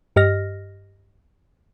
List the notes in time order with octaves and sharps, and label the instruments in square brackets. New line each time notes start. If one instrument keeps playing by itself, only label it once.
[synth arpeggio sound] G2 G4 D#5 F6 A#6